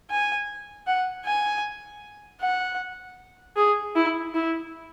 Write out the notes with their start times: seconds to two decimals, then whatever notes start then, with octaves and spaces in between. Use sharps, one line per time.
0.11 G#5
0.87 F#5
1.25 G#5
2.42 F#5
3.57 G#4
3.95 E4
4.34 E4